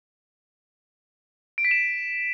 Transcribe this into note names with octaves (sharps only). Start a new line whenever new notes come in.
D7
B6
E7